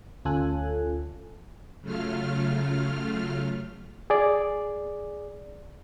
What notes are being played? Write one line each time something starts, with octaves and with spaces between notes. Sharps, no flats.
D2 C#4 F4 A4 G#5 F#6
C#3 F#3 A3 F4 F6
G#4 D5